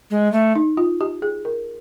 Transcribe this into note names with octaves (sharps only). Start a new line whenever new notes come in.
G#3
A3
D#4
F4
G4
G#4
A#4